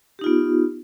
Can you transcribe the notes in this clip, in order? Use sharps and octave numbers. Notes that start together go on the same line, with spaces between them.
B3 D#4 F4 G4